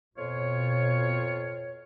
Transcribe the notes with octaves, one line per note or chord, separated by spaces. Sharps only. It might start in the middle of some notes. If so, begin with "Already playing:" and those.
F2 B2 F4 C#5